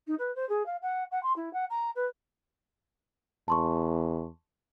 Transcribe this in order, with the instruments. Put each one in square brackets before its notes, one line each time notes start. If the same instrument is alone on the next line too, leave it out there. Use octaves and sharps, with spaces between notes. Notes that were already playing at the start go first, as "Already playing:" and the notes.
[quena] D#4
B4
C5
G#4
F5
F#5
F#5
C6
E4
F#5
A#5
B4
[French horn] E2 [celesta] A5 C6 C#6